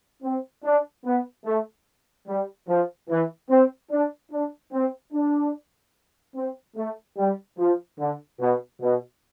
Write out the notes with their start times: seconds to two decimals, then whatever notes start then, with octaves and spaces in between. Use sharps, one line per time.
0.23 C4
0.64 D4
1.05 B3
1.45 A3
2.28 G3
2.68 F3
3.09 E3
3.50 C4
3.91 D4
4.32 D4
4.73 C4
5.13 D4
6.36 C4
6.76 A3
7.18 G3
7.59 F3
7.99 D3
8.40 B2
8.81 B2